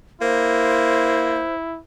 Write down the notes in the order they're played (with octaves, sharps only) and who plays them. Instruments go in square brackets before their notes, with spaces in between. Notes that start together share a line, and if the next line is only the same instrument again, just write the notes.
[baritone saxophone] A#3 [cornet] E4 [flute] C5